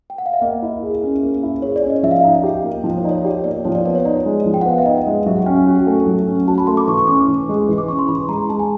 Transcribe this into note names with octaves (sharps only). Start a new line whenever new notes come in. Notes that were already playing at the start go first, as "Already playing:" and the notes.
G5
F#5
F5
E5
A#3 D#5
E4
G#4
C#4
A#3
E4
G#4 C#5
D5
C#4
D#5
F3 E5
F5
D#4 E5
G4
A#3
F3 D#5
C#5
D#4 D5
C#5
G4 D5
A#3 D5
F3 C#5
D5
B3 D5
C#5
D#4 D5
G#3
F3
G5
F#5
B3 F5
E5
D#4 D#5
G#3
F#3 E5
F#5
C#4 G5
G#5
F#4
A3
F#3
C#4
F#4 A5
B5
A3 C6
D6
E3 C#6
C#6
C#4 D6
E3
G#3
E3
D6
C#4 C#6
C6
E3 B5
G#3 A#5
G#3 A5
G#5